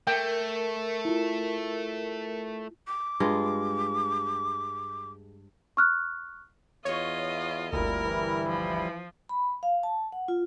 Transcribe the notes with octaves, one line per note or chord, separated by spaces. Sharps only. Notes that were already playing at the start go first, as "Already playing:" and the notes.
A3 A#4 G5
E4 F4
D6
G2 G#3 F4
C#6 F6 F#6
E2 F4 C#5 D#5
G1 D2 A#2 G3 E4 A#4
E3
F3
B5
F5
A5
F#5
F4